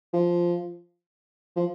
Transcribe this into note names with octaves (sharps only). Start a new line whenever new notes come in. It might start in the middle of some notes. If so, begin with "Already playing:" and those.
F3
F3